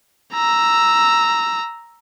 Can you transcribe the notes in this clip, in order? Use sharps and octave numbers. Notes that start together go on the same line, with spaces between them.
A#5 E6